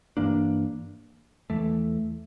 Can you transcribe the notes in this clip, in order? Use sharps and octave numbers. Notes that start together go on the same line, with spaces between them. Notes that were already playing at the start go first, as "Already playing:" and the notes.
G2 E3 A#3 D4
E2 E3 A3